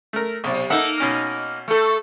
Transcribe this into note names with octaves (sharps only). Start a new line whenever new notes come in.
A3 A#4
B1 C3 D5
A#3 D#4 A4 E5 F#5
B2 C#4 F6
A3 A4